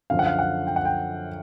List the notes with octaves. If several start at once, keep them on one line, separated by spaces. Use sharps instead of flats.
F#2 D3 F3 F5
F#5
F5
F#5
G5
F#5
G5